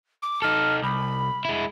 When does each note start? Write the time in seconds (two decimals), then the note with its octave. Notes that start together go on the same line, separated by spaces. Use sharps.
0.22 D6
0.42 D#4 A4 F6
0.82 C2 B5
1.45 G#3 E4